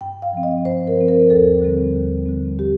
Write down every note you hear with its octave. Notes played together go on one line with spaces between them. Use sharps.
G2 G5
F5
F3 C4
D#5
G2 C5
A#4
F3 C4
A#4
D#2 A4
D3 G3 C4
D#2
D3 G3 C4
G4